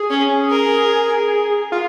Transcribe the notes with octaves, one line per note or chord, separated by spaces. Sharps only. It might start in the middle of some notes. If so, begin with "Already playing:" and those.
Already playing: G#4
C#4
A#4
F4